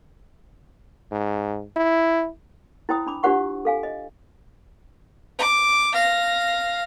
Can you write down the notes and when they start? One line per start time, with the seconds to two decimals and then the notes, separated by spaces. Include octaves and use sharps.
1.11 G#2
1.76 E4
2.89 E4 C5 G5 B5 D#6
3.06 D4 B5 D6
3.23 D4 F4 G4 C5 F#5 C#6
3.65 A4 F5 G#5
3.83 D#5
5.39 D6
5.93 F5 A#6